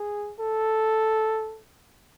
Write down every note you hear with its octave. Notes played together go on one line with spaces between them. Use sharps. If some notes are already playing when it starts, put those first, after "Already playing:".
Already playing: G#4
A4